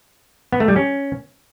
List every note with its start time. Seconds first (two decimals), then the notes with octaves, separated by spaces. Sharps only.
0.52 B3
0.60 A3
0.68 G3
0.76 C#4